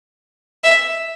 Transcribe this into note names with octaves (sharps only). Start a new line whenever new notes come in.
E5